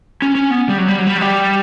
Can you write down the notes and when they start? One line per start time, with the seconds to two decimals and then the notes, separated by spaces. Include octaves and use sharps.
0.22 C#4
0.35 C#4
0.51 B3
0.69 G3
0.78 F#3
0.88 G3
0.98 F#3
1.07 G3
1.17 F#3
1.21 G3